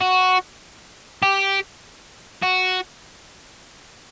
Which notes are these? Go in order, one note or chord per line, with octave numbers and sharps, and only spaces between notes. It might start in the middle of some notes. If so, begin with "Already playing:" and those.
F#4
G4
F#4